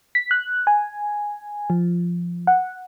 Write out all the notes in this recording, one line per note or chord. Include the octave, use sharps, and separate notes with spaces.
B6
F#6
G#5
F3
F#5